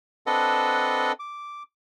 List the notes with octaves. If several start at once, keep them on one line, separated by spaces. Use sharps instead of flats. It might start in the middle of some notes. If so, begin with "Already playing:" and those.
C4 D4 A4 B4 D#5 F#5
D6